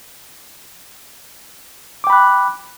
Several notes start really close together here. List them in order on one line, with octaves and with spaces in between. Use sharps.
D6 G5 B5 F#6